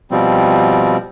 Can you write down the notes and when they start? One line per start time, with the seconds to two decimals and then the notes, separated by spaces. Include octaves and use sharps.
0.11 B2 F3 G3 C4